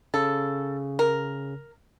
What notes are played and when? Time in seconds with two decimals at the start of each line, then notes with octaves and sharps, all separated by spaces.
0.14 C#3 A4
0.99 A#4